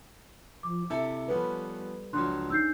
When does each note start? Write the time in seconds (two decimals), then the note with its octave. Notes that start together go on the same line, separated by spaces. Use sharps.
0.63 F3 D6
0.90 C3 E4 A4 E5
1.28 F3 G3 B3 C#4 A4 B4
2.13 C#2 F3 F#3 D4 C6 F#6
2.50 C#4 D#4 E6 G6 C7